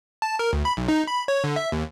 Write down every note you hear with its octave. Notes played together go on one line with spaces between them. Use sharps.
A5
A#4
D2
B5
B1
D#4
B5
C#5
D3
E5
D#2